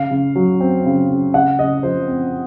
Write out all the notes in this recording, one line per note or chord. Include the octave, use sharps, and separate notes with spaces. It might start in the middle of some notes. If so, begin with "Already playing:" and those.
Already playing: C#3 F5
C#3
F#3
C4
C#3
C#3
C#3 F#5
C#3 D#5
F3 C5
C4